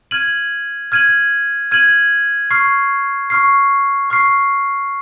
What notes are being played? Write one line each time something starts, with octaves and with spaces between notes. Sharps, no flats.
F6 G#6 D#7 F#7
F6 G#6 D#7 F#7
F6 G#6 D#7 F#7
C#6 F6 C7
C#6 F6 C7
C#6 F6 C7